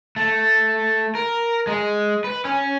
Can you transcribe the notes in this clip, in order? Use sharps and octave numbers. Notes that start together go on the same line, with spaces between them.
A3
A#4
G#3
B4
C#4